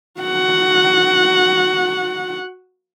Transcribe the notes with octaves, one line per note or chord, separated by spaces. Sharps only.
F#4 F#5